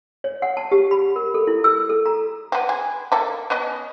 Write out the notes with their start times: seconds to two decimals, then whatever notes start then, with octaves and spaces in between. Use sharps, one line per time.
0.24 C#5
0.42 F#5
0.57 A5
0.72 G4
0.91 B5
1.16 A#4
1.34 A4
1.47 E4
1.64 E6
1.89 A4
2.06 A#5
2.52 B3 C4
2.69 G#4
3.12 A#3 A4
3.50 B3 C#4 D#5